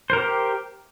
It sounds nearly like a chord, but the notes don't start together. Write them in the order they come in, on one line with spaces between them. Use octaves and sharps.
C5 A#4 G4